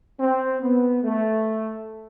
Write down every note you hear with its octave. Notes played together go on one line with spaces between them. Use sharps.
C4
B3
A3